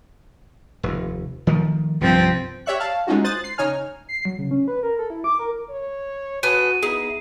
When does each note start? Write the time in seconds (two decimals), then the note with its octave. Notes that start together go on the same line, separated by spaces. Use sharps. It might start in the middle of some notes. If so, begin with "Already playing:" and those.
0.83 F1 D#2
1.47 D#3 F3 A3
2.01 C2 G2 F3 C4
2.66 G4 C#5 D5 E5 C#6 F#6
2.80 F5 A5
3.07 G#3 A3 C#4 D#4 F4 F#4
3.24 C5 D#6 F#6 A6
3.44 C7
3.58 C#3 D#4 C#5 G#5 F6
4.09 C7
4.25 F#3
4.38 C#3
4.51 C#4
4.68 B4
4.83 A#4
4.99 A4
5.10 E4
5.24 D6
5.39 A#4
5.70 C#5
6.43 B3 F#4 G#4 A4 D#7
6.83 B3 D#4 E4 G#4